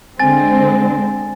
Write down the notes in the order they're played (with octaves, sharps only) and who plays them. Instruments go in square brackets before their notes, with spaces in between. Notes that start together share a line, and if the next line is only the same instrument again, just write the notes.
[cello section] D3 G#3 C4 [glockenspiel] G#5 A6